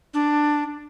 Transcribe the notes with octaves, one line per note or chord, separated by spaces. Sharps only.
D4